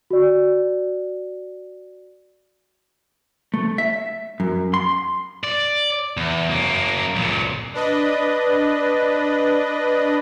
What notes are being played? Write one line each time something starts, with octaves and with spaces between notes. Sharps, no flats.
F#4 D5
A3
E5
F#2
C6
D5
E2
F#2 A#3
C#2 A#2
D4 B4 D#5